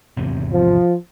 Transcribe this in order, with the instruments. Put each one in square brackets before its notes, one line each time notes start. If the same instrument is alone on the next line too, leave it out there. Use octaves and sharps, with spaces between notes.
[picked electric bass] G#1 E2 C3
[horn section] F3